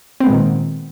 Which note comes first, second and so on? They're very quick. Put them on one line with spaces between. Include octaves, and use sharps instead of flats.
C4 B3 G#3 A#2 D#3